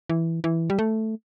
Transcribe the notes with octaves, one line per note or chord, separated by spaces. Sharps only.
E3
E3
G3
A3